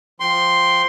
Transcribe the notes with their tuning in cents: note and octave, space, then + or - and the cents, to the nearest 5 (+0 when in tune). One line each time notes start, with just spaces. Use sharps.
F3 +0 G5 +0 C6 +0